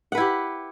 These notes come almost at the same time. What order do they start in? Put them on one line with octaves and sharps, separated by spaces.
F#5 B4 E4 G4